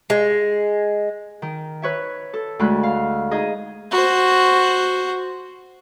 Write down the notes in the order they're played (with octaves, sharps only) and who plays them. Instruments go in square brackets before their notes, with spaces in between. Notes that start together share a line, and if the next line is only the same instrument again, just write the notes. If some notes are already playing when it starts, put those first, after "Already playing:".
[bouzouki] G#3
[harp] D#3
B4 C#5 E5
A4
D2 G#3 B5 F#6
F5
D#4 G#4 D#5
[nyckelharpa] F#4 C5